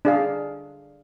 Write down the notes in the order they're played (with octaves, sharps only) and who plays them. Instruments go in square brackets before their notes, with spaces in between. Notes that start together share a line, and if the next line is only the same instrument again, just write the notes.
[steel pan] D4 G#4 F5